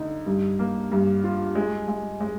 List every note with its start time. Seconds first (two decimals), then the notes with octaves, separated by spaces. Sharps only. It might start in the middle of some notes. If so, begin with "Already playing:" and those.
Already playing: D3 D#4
0.26 G2
0.59 A#3
0.92 G2
1.24 F4
1.55 G#3
1.88 G#3
2.20 G#3